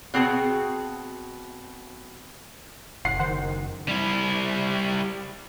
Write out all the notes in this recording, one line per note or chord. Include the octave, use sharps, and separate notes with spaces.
B2 C4 F#4 G#4 A5
F#1 F#5 C7
D#3 C5 F#5
G3 E4